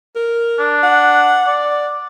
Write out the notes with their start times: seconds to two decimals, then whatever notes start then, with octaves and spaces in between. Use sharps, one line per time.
0.16 A#4
0.59 D4
0.83 F#5
1.47 D5